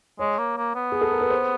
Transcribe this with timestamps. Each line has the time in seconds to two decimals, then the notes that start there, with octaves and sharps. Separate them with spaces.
0.19 G#3 C#5
0.38 A#3
0.57 A#3
0.75 B3
0.92 G#4
1.01 A4
1.11 A#4
1.21 B4
1.30 C5